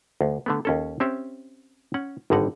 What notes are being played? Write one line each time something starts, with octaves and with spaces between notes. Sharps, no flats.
D2
D3 A3 B3
D#2 C#4 A4
C4 C#4 G4 E5
C#4 F#5
G#1 G2 D3 D#4 F#5